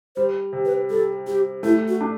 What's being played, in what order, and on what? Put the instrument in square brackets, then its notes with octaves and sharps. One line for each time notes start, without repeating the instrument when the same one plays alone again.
[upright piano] G3 [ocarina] C5
[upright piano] C3
[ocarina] B4
[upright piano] G3 [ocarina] A4
[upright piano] G3 [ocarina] G4
[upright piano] A3 [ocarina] E4
[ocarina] F#4
[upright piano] D4